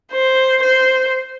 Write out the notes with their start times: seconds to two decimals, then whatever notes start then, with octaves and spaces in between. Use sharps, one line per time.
0.12 C5
0.62 C5